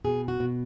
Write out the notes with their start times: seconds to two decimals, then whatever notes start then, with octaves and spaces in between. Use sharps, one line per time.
0.04 B2 G#4
0.28 F#4
0.40 B2